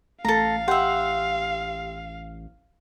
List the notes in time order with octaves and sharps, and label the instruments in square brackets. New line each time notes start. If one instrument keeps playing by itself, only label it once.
[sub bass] A1 [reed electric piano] A3 [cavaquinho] A4 A#5 [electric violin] F5
[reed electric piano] G4 G5 C6 [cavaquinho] E5 F#5